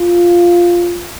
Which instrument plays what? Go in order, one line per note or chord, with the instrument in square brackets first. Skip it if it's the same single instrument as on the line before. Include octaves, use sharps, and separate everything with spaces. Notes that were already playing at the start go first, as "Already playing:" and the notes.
Already playing: [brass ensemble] F4